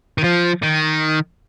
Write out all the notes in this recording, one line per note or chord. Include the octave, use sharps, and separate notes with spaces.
D#3
F3
D#3